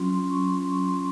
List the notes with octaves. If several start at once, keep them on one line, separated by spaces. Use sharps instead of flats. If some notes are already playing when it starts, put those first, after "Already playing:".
Already playing: F#3 C#4 F4 C6
C6
C#6
C6
C#6
C6
C#6